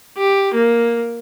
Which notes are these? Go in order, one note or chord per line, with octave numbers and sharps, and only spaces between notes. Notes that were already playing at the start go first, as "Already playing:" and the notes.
G4
A#3